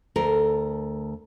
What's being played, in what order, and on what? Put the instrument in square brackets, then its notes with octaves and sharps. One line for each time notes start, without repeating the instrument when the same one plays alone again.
[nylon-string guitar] D2 A4 A#4